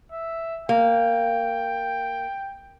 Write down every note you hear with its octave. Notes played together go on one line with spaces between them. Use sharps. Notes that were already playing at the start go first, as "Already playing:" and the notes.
E5
A#3 G5